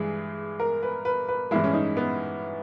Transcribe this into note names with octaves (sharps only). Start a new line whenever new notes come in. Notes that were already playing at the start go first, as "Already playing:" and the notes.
Already playing: G2 E3 G#3 G#4
A#4
B4
B4
B4
G2 E3 G#3 E4
C#4
D#4
B3